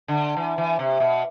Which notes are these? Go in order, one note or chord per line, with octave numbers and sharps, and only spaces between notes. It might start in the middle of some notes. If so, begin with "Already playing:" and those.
D3
E3
E3
C3
B2